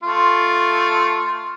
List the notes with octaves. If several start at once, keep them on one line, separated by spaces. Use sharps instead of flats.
A3 F4